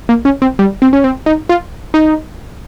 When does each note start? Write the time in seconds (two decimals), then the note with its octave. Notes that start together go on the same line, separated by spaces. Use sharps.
0.09 A#3
0.25 C#4
0.42 C4
0.59 G3
0.82 C4
0.93 C#4
1.04 C4
1.26 D#4
1.49 F4
1.94 D#4